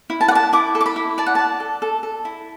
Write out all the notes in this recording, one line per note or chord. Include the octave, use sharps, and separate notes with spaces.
E4
A5
F#5
D5
A5
E4 D6
A4
D6
B5
E4
D5 A5
F#5
D5 A5
A4
A4
A4
E4